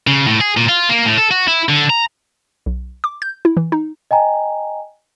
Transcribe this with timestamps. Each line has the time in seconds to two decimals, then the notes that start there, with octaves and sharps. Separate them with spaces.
0.07 C#3
0.27 A2
0.41 G#4
0.57 A#2
0.69 F4
0.89 A#3
1.05 A2
1.18 A4
1.31 F#4
1.48 E4
1.69 D3
1.90 A#5
2.66 B1
3.04 D6
3.22 G6
3.45 E4
3.57 E3
3.72 D#4
4.11 D#5 G5 G#5 A#5